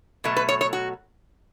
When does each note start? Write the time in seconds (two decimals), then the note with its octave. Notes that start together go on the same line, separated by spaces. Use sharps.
0.24 B2 F#3 A3
0.37 B4
0.49 C#5
0.61 C#5
0.73 F#4